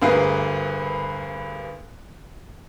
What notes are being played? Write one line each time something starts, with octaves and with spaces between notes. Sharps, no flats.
D2 G2 A#3 G#4 B4 F5